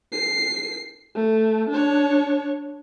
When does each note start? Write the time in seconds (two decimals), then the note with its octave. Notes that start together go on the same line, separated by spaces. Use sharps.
0.13 C7
1.16 A3
1.70 D4 C#5